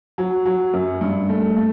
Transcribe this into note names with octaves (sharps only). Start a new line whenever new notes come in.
F#3
F#3
F#2
G2
A3
A3